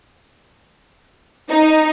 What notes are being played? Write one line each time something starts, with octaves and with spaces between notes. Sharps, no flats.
D#4